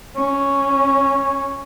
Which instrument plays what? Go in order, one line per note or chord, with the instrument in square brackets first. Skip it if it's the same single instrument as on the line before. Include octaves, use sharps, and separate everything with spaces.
[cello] C#4 [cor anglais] C#5